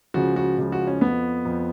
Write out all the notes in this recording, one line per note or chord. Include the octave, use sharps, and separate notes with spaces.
C#2 C#3 F3 F#4
F#4
C#2 C#3 F3
F#4
C#4
F2 F3 B3
F2 F3